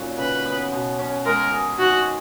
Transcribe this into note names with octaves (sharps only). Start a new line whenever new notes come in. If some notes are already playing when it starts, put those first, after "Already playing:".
Already playing: A#2 F#3 C#4 D#4
C#3 B4
B3
B2
C#4
G#3 A#4
G#4
D#3 F#4